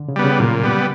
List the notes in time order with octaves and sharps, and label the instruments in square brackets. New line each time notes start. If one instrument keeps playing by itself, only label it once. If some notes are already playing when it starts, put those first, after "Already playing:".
Already playing: [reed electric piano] D3
C#3
[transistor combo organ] G3 B3
[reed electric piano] C#3
[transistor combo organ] A#2 [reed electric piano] F#3
[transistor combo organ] G3 B3